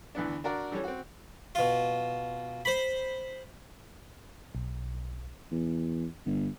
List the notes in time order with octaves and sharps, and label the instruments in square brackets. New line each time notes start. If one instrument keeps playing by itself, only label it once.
[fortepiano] D2 E3 B3 D4
D4 F#4 A#4 D5
E3 G3 C#4 A4 C#5
C4 F#4
[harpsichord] B2 F4
C5 B5
[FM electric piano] B1
[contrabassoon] E2
G1